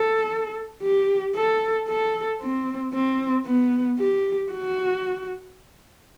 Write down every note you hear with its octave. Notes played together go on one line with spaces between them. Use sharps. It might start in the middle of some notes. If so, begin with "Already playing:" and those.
Already playing: A4
G4
A4
A4
C4
C4
B3
G4
F#4